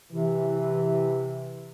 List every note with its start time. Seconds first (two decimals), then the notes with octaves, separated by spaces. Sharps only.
0.12 C3 E3